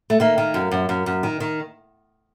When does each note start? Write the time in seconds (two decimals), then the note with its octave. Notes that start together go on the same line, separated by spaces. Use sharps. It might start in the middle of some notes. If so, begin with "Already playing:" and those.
0.10 A3
0.20 D#3 A#3
0.38 D#3
0.54 F#2
0.72 F#2
0.89 F#2
1.06 F#2
1.23 D#3
1.40 D#3